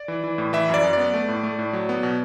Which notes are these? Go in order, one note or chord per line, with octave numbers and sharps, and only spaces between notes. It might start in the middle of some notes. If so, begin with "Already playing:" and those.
Already playing: D5
E3
E3
A2
E3 E5
F#2
D5
F#2
B3 D5
A3
A2
A3
A2
F#3
B3
B2